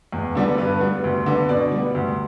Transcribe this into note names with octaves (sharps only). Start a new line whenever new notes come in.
E2
D3 G3 B3
G2 B4
G3 B3
D2
D3 B3
B2 D5
G3 B3
D2